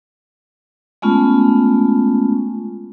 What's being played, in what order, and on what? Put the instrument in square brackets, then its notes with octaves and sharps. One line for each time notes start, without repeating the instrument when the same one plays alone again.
[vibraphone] G#3 A3 B3 C#4 F4